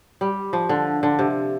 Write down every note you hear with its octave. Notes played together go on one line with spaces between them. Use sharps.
G3
F3
D3
D3
C3